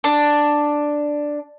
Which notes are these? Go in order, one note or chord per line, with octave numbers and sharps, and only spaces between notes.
D4